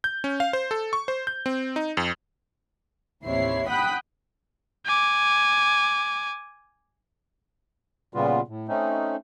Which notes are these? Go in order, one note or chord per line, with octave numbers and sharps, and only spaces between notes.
G6
C#4
F5
C5
A4
C#6
C5
G6
C4
D#4
F2
A1 D#2 C3 E4 C#5 C7
F#5 G5 B5 D#6 F#6 B6
G#5 D6
A#2 C#3 G3 B3 F4 F#4
A2
A3 C4 C#4 D#4